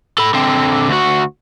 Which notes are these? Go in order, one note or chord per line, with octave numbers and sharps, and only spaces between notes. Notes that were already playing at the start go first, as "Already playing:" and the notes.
A4 B5
D3 C4
D2 F#4